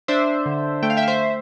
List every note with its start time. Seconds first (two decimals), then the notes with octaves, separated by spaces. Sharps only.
0.08 D4 C5 E5
0.46 D3
0.83 A3 G5
0.90 F5
0.97 E5 G5
1.03 F5
1.08 C5 E5